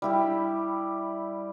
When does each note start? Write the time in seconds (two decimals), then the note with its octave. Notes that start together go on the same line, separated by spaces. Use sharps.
0.02 G3 E4 G4